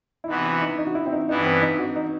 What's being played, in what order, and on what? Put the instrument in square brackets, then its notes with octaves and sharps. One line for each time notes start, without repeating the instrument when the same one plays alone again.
[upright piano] E4
[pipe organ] C3 E3 B3 F#4 [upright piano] D#4
[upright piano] E4
D#4
D#4
F#4
E4
C4
D#4
[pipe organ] G2 E3 B3 E4 [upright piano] D#4
[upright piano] C4
D#4
F#4
D#4